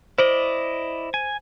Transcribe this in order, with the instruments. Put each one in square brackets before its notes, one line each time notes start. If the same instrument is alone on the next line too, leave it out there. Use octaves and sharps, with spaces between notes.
[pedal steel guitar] E4 D5 D#5 [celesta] C5
[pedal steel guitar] G#5